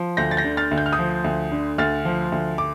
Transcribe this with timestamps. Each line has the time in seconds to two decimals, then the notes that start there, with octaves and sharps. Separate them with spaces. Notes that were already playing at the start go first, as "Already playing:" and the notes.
Already playing: F3
0.17 D2 G6 A#6
0.31 A6
0.37 G6 A#6
0.44 D3
0.57 F6 A6
0.71 D2
0.78 G6
0.86 F6
0.93 D#6 G6
0.99 F3
1.24 D2
1.52 D3
1.78 D2 F6 A6
2.05 F3
2.32 D2
2.58 D6